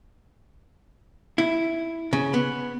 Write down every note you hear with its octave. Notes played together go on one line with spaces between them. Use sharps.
E4
C#3
B3